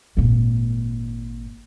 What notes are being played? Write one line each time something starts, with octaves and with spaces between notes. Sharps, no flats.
G#1 A#2